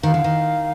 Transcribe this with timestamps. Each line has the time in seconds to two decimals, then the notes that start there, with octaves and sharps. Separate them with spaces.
0.03 D#3 F5
0.14 D3
0.24 D#3